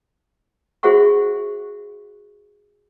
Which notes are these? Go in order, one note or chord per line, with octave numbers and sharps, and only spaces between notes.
F#4 G#4 C5 E5 F#5 C#6